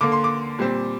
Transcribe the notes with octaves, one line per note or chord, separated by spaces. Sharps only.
D3 A#3 D6
C6
D6
A#2 G3 C4